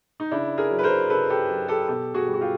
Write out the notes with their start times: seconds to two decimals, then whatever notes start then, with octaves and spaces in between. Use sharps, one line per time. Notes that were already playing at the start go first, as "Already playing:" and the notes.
0.20 D#4
0.31 C#3 D4 E4
0.57 G#4 A#4
0.71 F#3
0.79 B4
0.83 A#4 C5
1.10 C#3 A4 B4
1.30 G4 A4
1.49 F#3
1.68 G4 A4
1.88 B2 G4 A4
2.14 F#4 G#4
2.28 G3
2.34 F#4
2.41 F4 G4